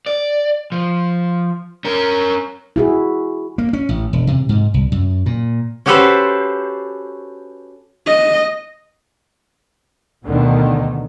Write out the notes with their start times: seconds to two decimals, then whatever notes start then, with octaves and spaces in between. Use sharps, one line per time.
0.06 D5
0.72 F3
1.85 C#4 A#4
2.76 E4 F#4 G#4
3.58 A#3
3.73 C#4
3.89 A1
4.13 E1
4.27 C3
4.49 G#2
4.74 C2
4.92 F#2
5.26 A#2
5.86 C#4 F#4 G4 A4 B4 C5
8.07 D#5
10.24 D2 B2 D3 D#3